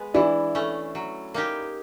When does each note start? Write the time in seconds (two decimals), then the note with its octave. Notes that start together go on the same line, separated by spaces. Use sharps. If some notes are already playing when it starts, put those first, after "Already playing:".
Already playing: G#3 B3
0.14 E3 D4 E4
0.55 A3 C#4
0.95 F#3
1.34 A#3 D#4 G4